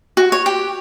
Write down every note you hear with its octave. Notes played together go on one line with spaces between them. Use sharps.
F#4
C#5
G4